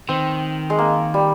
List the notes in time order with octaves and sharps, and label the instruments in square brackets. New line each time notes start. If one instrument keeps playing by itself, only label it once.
[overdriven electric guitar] D#3 [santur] C4
[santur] G#3
A#3
G3